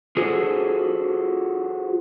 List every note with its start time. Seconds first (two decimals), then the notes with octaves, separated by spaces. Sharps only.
0.17 F4 F#4 G#4 A4 C5